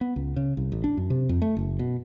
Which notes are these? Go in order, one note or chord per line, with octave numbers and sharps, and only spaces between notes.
B3
C#2
C#3
C2
A1
D4
F#2
C3
F2
A3
F#1
B2